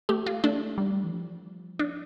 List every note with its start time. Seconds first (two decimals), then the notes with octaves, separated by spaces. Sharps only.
0.09 A3 G4
0.26 F4
0.44 A3 D4
0.78 G3
1.04 E3
1.11 F3
1.79 D4